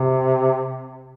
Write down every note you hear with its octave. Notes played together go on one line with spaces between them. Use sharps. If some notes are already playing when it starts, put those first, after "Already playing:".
Already playing: C3